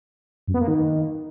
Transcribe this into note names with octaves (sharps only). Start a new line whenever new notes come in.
F#2
B3
A#3
D#3